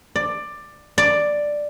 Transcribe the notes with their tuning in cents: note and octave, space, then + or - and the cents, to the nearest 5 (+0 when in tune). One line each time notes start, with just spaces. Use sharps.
D5 +15
D5 +5